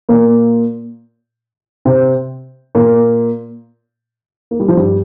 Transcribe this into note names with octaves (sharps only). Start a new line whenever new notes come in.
A#2 A#3
C3 C4
A#2 A#3
A#3
G3
F3
G2 G3